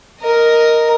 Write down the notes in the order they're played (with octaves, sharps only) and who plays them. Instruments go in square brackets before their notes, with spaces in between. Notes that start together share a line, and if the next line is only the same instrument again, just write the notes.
[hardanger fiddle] A#4 D#5